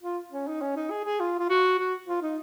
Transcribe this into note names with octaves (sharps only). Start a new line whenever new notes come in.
F4
C#4
D#4
C#4
D#4
G#4
G#4
F4
F4
F#4
F#4
F4
D#4